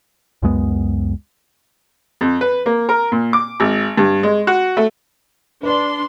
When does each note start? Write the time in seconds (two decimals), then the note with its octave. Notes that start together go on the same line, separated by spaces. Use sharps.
0.42 C#2 F#2 G#3 B3
2.21 F2
2.41 B4
2.66 A#3
2.89 A#4
3.12 A#2
3.33 D6
3.60 G#1
3.97 G2
4.23 G#3
4.47 F#4
4.77 A3
5.63 D4 B4 D5 C6